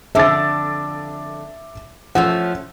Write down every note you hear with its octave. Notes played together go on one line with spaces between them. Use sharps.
F2 D3 D4 E5 D6 A6
F3 A3 C#4 F#5